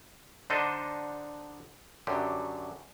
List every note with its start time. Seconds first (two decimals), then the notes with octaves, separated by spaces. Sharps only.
0.50 D3 D4 D#4 A4 C5 D#5
2.07 F#2 D3 F#3 G4